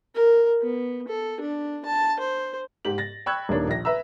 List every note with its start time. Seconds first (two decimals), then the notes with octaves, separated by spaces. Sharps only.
0.15 A#4
0.61 B3
1.08 A4
1.40 D4
1.85 A5
2.20 C5
2.85 G#2 G4 F#7
2.98 A6 A#6
3.26 G5 B5 C#6 E6 F#6 G#6
3.49 D#1 D#3 A#3 D4 C#5
3.68 A#1 A#6
3.85 B4 E5 A#5 E6